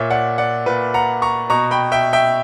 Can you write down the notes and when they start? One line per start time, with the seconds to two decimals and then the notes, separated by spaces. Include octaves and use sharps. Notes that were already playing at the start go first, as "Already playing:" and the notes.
Already playing: A#2 C#5 E5
0.10 D5 F#5
0.38 D5 F#5
0.66 A#2 B4
0.94 F#5 A#5
1.22 A#5 C#6
1.50 B2 A#5 C#6
1.71 G5 B5
1.92 E5 G5
2.13 E5 G5